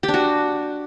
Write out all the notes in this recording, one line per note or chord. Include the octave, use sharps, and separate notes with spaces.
G4
D4
F#4